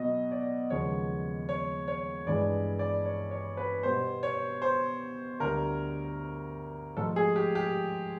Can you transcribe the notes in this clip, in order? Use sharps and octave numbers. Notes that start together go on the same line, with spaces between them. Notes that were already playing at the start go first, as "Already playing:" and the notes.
Already playing: B2 F#3 B3 D#5
D5
D#2 C#3 F3 G#3 B3 C#5
C#5
C#5
G2 E3 G#3 D5
D5
C#5
C#5
B4
B2 G3 B3 C5
C#5
C5
D2 D3 G3 A#4
G#2 F3 A3 A4
G#4
G4
G4